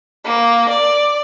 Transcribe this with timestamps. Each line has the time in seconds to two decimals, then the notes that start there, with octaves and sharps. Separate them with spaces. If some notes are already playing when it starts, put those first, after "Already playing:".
0.25 A#3
0.69 D5